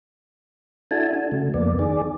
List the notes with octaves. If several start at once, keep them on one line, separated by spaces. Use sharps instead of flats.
D4 E4 F#4 A4 G#5 A5
D4 F#4
C#3 A3
F2 A#3 B3 D5
D#3 G#4 D5